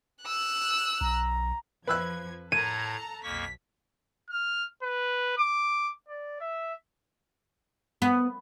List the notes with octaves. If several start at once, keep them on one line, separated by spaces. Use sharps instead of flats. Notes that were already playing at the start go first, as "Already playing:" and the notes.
E6 F#6
B1 A#5
F2 F3 B4 E6 F#6 G#6
A2 A4 A5 A#5 G#6 D#7
B1 F2 A#3 C#6 B6
F6
B4
D6
D5
E5
B3